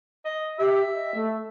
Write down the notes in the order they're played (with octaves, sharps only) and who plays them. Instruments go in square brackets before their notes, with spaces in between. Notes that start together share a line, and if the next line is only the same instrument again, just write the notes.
[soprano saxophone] D#5
[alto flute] G4 [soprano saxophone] E5
[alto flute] D#5
A3